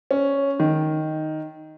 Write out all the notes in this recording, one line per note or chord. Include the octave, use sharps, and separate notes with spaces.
C#4
D#3